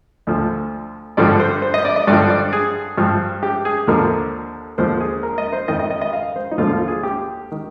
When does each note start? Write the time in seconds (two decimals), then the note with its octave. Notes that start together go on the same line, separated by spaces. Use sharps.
0.27 D2 D3 F3
1.17 G2 D3 F3 D5
1.40 C5
1.62 C5
1.74 D#5
1.85 D5
1.96 D#5
2.07 G2 D3 F3 D5
2.30 D5
2.53 G#4
2.98 G2 F3
3.43 G4
3.65 G#4
3.87 D#2 D3 F3 A#4
4.78 D#2 D3 F3 C5
5.00 G#4
5.23 A#4
5.38 D#5
5.52 C5
5.68 F2 D#3 D#5
5.79 D#5
5.90 D#5
6.02 D#5
6.13 F5
6.36 C5
6.51 D#4
6.58 D#2 D3 F3 F4
6.73 F4
6.88 G#4
7.03 G4
7.52 D#3